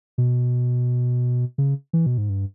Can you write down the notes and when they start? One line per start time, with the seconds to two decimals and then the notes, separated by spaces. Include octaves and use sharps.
0.18 B2
1.58 C#3
1.93 E3
2.06 B2
2.18 G#2
2.29 G2